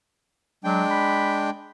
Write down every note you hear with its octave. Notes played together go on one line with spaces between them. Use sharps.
F#3 G#3 D4 G5
B5